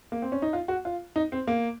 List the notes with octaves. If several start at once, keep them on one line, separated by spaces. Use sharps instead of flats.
A#3
C4
C#4
D#4
F4
F#4
F4
D#4
C4
A#3